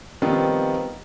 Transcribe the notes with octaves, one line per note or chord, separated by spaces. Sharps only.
D#3 F3 G3 B3 C4 F4